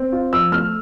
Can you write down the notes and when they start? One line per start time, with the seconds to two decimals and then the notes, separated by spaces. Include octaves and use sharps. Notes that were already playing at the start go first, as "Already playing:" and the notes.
Already playing: C4
0.12 F4
0.33 F3 E6
0.52 A3 F6